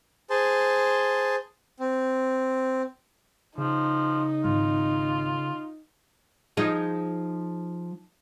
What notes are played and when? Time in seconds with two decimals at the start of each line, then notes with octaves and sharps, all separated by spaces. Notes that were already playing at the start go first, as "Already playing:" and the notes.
0.30 G#4 C5 A5
1.80 C4
3.58 C#3 F3 D#4
4.44 G#1 F4
6.57 F3 D#4 G#4